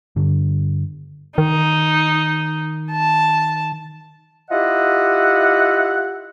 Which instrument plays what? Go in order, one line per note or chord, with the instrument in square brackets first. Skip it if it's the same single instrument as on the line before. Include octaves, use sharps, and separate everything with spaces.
[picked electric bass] G2 D3
[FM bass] D#3 [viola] D#4
[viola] A5
[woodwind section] E4 F4 G4 D#5 E5 F#5